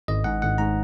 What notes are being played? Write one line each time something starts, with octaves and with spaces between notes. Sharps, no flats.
G#1 D#5
G#2 F#5
G#1 F#5
G#2 A#5